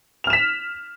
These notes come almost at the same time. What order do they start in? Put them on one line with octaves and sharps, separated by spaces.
F7 F6 E7 B6